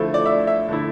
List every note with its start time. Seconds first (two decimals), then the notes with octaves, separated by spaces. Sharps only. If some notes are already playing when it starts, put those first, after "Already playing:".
Already playing: D3 F3 A3 E4
0.14 D5
0.26 E5
0.47 E5
0.69 D3 A3 E4